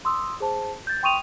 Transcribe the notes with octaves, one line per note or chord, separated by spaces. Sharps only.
C6 D#6 E6
G#4 C5 A5
G6 A6
G5 C6 C#6 D#6 D#7 F7